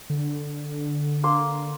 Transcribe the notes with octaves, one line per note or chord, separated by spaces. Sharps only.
D3
A#3 C6